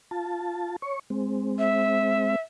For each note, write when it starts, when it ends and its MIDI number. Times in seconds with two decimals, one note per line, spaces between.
0.11 0.76 65
0.11 0.76 81
0.82 0.99 73
0.82 0.99 85
1.10 2.36 56
1.10 2.36 60
1.59 2.40 76